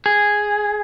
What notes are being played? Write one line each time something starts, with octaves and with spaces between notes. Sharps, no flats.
G#4